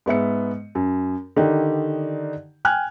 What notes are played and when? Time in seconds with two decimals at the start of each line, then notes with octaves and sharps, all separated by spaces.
0.06 G#2 B3 E5 C#7
0.75 F#2
1.36 D3 D#3 D#4 G4
2.65 G5 G#5 F6 F#6 G#6